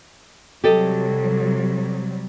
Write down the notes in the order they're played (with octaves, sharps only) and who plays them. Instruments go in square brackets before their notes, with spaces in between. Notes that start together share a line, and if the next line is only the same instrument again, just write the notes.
[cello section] C3 F#3 G3 [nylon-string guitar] G4 A4 D#5